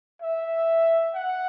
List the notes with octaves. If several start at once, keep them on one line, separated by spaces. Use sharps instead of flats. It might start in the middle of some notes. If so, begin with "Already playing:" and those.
E5
F#5